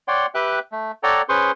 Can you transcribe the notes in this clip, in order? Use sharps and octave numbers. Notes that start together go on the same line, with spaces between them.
C#5 D5 F#5 G5 C6
G4 B4 E5 G5 F#6
A3
A4 C#5 D5 F#5 G5 A#5
C#4 G#4 B4 C5 C6 C#6